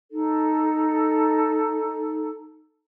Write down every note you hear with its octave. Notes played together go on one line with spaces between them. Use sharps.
D#4 A4